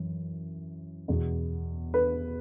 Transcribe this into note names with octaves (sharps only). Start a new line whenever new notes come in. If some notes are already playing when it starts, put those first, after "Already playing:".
Already playing: F#2 E3
E2 B2
B4